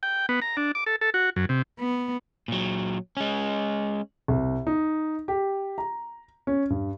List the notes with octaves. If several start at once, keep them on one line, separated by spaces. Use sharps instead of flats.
G5
B3
A#5
D4
D6
A4
A4
F#4
F#2
C3
B3
A#2 F#3
G#3 C#4
C2
D#4
G4
A#5
C#4
G2